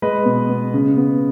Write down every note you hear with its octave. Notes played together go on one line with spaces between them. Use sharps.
G#3 B4 D#5
B2
B3
C#3
B3